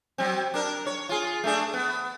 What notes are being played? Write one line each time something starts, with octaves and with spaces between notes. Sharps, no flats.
F#3 C4
D4 A#4
C#5
F4 G#4
A3 D4 G#4
B3